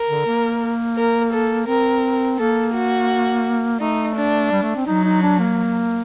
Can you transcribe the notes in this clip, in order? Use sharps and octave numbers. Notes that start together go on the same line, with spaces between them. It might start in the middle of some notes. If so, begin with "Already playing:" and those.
Already playing: A#4
D3
A#3
A#4
A4
C4 A#4
A#3 A4
F#4
A3 D#4
D4
G3
A3
C4
F#3 D#4
D#4
D4
A#3